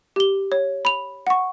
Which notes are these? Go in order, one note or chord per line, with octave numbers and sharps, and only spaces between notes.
G4 G7
C#5
B5 F7
F#5 C#6